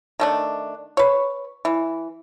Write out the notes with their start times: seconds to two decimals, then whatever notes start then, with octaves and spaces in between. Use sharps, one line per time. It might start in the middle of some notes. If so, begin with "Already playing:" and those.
0.20 D#3 A3 D4
0.97 B4 C#5
1.65 E3